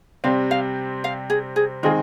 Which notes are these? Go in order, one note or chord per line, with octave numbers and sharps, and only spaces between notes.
C3 G3 C4 F5
F5
F5
G#4
G#4
D#3 G#3 C4 D#4 F4 G#4